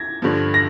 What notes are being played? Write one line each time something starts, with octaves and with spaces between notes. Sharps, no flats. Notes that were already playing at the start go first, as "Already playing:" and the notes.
Already playing: G#6 A#6
G2 D3 F3
A#6